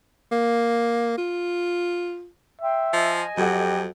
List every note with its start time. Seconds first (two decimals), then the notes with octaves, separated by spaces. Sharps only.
0.32 A#3
1.18 F4
2.61 E5 G5 C6
2.93 F3 D#5 G#5
3.37 F2 F#3 G4 A4 F#5